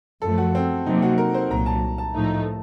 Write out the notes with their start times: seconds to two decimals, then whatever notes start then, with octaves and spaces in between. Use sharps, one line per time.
0.22 F#2 F3 A3 A4
0.38 F#4
0.55 C4
0.86 C3 F#3 A#3 D#4
1.02 F#4
1.18 A#4
1.34 C5
1.50 C2 A#2 F#3 A#5
1.66 A5
1.98 A5
2.15 A2 F3 A3 D#4